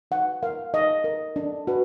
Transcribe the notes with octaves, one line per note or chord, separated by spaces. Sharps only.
D#4 F#5
A#4 F5
D#4 D#5
A#4
D4
F#4 B4